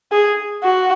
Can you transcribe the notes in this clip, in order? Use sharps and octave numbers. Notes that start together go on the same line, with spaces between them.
G#4
F#4